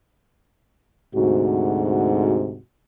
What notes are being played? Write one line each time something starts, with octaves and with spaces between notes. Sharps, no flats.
D2 G#2 C3 F#4